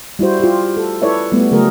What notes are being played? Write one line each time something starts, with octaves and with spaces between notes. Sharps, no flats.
G3 E4 F#4 C5
F4 G4
A4
E4 A4 B4 C#5 D5 E5
G3 A3 B3
C#3 F#3 A3 G#4 A#4